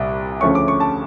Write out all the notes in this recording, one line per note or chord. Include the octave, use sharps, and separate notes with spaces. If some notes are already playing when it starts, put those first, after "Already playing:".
Already playing: C2 A#2 G3
D2 C#3 F3 A3 C#4 C#6
D6
C#6
A5